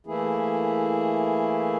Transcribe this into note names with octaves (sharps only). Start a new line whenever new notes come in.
E3 A3 A#3 E4 G#4